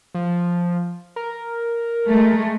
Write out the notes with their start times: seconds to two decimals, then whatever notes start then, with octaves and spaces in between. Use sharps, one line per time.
0.14 F3
1.16 A#4
2.09 G#3 A3